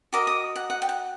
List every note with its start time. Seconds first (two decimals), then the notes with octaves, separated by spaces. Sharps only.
0.13 F#4 A#4 D#5 D6
0.27 D#6
0.56 F#5
0.70 F#5
0.82 G5
0.89 F#5